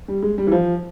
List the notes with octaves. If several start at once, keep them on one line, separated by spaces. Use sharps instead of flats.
G3
G#3
G3
E3
F3